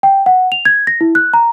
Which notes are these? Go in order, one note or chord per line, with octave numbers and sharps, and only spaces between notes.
G5
F#5
F7
G#6
A#6
E4
F#6
A#5